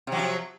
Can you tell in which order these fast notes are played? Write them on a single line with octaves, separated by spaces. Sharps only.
C3 F#3 F3